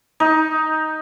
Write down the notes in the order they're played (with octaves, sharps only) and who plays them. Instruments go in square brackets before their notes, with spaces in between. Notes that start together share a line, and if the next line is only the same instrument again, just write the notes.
[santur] D#4